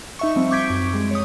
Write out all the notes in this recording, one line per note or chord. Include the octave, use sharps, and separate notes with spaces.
D#4 E5 C#6
F3 G3 C4
C#6 D6 G6 G#6 B6 D7
F#2
G3 G#3
C#5 D#6